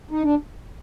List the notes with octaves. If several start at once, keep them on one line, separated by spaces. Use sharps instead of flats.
D#4
D4